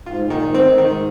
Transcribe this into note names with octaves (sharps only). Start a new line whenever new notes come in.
G#2 F4
A#2
D#3
G#2
C4
D#3
G#2 D#3